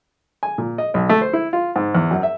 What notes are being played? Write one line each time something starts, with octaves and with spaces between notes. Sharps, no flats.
G#5
A#2
D#5
B1
A3
C5
E4
F4
G#2
E2
F#2
E5